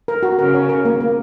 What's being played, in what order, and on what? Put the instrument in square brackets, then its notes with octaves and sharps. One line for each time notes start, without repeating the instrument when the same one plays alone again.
[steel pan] A#4
F#4
[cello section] C#3 [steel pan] A#4
[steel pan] C#5
A#4
A#3
A#3